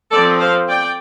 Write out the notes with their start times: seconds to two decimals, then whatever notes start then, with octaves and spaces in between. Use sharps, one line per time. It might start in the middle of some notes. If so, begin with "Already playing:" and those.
0.11 F3 C4 A4 D5
0.40 C5 F5
0.68 D5 G5